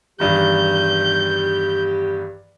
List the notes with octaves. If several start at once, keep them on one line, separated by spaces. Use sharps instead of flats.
E2 G2 D#3 G4 G6